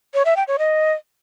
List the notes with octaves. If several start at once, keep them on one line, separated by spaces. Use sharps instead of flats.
C#5
E5
G5
C#5
D#5